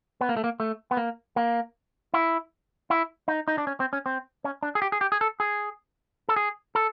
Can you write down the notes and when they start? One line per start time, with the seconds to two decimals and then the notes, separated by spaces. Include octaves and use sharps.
0.21 B3
0.29 A#3
0.37 A3
0.44 A#3
0.60 A3
0.91 B3
0.97 A#3
1.36 A#3
2.14 E4
2.90 E4
3.28 D#4
3.48 D#4
3.58 D4
3.67 C#4
3.80 C4
3.93 C#4
4.06 C4
4.44 C#4
4.63 D4
4.75 G#4
4.82 G4
4.92 G#4
5.01 G4
5.12 G#4
5.21 A4
5.40 G#4
6.29 A4
6.36 G#4
6.75 A4